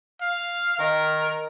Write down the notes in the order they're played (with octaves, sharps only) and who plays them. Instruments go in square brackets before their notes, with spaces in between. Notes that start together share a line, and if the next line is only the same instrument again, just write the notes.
[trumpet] F5
[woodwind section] D#3 [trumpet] A#4